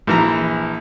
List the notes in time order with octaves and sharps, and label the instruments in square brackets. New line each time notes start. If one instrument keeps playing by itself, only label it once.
[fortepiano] A#1 E3 A#5